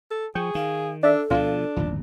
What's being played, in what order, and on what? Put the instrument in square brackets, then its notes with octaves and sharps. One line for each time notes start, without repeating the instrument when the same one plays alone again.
[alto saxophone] A4
[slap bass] F3 [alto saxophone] G#4 [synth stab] G5 C#6
[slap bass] D#3 [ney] F5
[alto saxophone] D4 [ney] A4 [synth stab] D5 E5
[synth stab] D2 F4 F5 [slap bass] B2 E3 F3 [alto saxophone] D4
[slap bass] D1 G1 D#2 [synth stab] F3